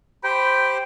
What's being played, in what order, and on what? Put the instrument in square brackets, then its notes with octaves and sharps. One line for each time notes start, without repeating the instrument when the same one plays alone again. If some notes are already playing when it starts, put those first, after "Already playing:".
[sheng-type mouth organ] G4 C5 [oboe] G5 [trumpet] B5